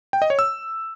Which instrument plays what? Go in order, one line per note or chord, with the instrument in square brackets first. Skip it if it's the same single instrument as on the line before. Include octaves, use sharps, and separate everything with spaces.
[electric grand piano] G5
D#5
C#5
E6